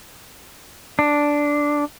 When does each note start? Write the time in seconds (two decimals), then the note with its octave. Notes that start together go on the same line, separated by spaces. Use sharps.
0.99 D4